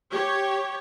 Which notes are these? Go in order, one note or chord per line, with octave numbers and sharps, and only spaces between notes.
G4 C#5